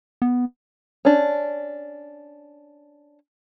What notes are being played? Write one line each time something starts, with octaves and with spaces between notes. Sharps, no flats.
B3
C#4 D4